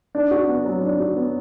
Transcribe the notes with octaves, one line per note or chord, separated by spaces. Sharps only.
D4
F#4
B3
F#3
D4
F#4
B3